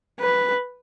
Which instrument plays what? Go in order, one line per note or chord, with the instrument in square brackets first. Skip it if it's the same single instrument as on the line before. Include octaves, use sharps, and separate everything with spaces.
[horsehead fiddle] B4